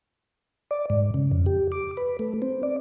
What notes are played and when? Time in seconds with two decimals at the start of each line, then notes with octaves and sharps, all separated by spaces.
0.71 D5
0.90 G#2
1.14 C#3
1.31 F2
1.46 G4
1.72 D6
1.97 B4
2.19 A3
2.42 C4
2.63 D5